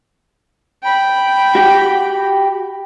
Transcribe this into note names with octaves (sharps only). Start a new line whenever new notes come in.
G5 B5
F#4 G4